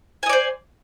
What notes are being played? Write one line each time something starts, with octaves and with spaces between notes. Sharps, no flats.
C5 D5 D#5 G#5